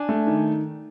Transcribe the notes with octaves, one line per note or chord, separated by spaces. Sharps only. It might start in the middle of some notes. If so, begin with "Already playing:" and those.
Already playing: D4 G#5
A3
D#3